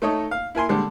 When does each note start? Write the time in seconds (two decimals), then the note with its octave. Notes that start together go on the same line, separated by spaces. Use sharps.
0.02 A3 D#4 A4 C#5 D#5
0.31 F5
0.55 E4 A#4 G#5 C6
0.69 D3 G3 G#3